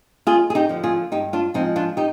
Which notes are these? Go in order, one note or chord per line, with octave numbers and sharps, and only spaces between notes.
D#2 F4 G#4
G#4
D#4 G4
D3 F3
F4 G#4
G2 D#4 G4
D4 F4
F3 G#3 C4 D#4
D4 F4
D#4 G4